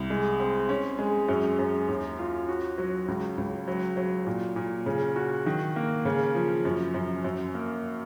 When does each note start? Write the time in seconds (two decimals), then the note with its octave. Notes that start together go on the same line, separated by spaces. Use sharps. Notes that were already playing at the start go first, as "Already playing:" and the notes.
Already playing: C2
0.10 G#3
0.40 C4
0.69 C#4
0.99 G#3
1.29 F#2
1.59 F#2
1.88 D#2
2.19 F4
2.49 F#4
2.78 F#3
3.08 C#2
3.38 C#2
3.68 F#3
3.97 F#3
4.27 A#2
4.56 A#2
4.86 C#3
5.16 F#4
5.46 D#3
5.76 A#3
6.05 C#3
6.35 F3
6.65 F#2
6.94 F#2
7.24 F#2
7.54 A#3